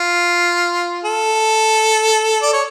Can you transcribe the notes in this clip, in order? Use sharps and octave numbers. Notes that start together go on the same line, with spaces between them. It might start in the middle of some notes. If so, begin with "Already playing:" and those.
Already playing: F4
A4
D5
C#5